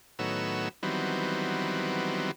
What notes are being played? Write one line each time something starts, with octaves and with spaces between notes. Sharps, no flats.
A2 D#3 F#3 B3 C#5 E6
D#3 E3 F#3 G3 B3 C4